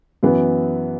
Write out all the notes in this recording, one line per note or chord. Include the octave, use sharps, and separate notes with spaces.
F#2 E3 B3